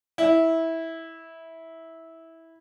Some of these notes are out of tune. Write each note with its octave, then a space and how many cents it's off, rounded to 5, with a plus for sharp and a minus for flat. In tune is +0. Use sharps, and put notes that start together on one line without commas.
E4 -15